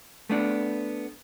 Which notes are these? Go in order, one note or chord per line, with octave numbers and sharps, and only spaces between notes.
A3 B3 D4